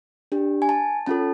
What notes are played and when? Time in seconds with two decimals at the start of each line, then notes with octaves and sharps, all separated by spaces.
0.32 D4 G4
0.62 G#5
0.69 A5
1.06 C#4 F4 A4 A5